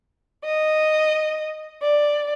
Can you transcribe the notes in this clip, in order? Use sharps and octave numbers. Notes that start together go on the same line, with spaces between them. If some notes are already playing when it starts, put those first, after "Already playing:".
D#5
D5